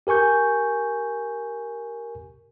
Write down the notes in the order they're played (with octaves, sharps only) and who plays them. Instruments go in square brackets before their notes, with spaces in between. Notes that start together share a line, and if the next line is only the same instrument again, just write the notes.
[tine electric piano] G4 A#4 G#5 C#6 G6